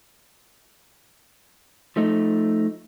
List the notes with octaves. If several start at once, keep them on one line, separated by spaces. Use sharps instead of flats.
F3 A3 D#4